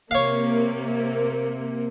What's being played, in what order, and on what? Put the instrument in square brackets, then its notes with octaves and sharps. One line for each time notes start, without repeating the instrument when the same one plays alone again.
[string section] C3 A#3 [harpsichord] C#5 F5